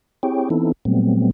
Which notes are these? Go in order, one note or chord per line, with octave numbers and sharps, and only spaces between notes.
C4 E4 G4 G#4 C#5 G5
E3 B3 C4 D#4 E4 A4
A#2 F#3 G3 A3 B3 C4